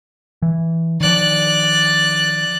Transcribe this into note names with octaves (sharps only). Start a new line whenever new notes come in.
E3
D#3 F3 D5 F#6